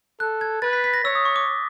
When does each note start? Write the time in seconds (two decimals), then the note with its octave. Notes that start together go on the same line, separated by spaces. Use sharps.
0.20 A4 F#6
0.41 G#6
0.62 B4 A6
0.73 B6
0.84 B6
0.94 A#6
1.05 C#5 E6
1.15 D#6
1.25 C#6
1.36 D6